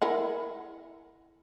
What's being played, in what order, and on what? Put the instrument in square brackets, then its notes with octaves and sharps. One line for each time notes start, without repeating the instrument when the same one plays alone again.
[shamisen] E4 A#4 F#5